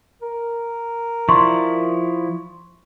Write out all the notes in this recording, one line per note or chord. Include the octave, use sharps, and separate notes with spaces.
A#4
F3 E4 D5 C6 C#6